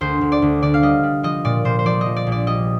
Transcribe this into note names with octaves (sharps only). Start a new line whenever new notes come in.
D2 C5
D2
D5
D2
D3 D5
F5
G3 D#5
G3
F3 D#5
A#2 D5
A#2 C5
C5
F3 D5
F3 D#5
D5
A#1
D5
G3 D#5